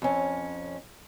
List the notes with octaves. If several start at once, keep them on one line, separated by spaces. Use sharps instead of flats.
F2 C#4